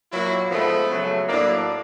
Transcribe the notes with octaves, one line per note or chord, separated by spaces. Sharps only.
A#2 F#3 A#3 E4
G#2 F3 A3 B3
C#3 F#3 A3
A2 F#3 A#3 D4